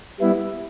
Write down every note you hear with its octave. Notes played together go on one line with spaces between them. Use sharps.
G3 B3 E4